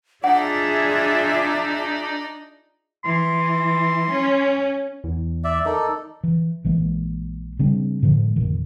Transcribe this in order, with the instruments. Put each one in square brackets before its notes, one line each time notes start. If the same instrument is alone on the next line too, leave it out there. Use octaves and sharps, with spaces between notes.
[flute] D4 [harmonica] D#4 D5 [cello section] F4 G#4 E5 [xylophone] F#5
[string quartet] E3 [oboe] C6
[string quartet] C#4
[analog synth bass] E2
[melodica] D5 E5
[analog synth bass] D#3 [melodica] D#4 A4 D5
[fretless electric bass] E3
A#1 E3 G#3 A#3
C#3 G3 C4 D4
A2 D3 F3 G#3
F1 A#2 D#3